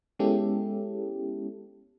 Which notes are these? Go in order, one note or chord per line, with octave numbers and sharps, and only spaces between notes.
G#3 B3 C#4 E4 G4 A4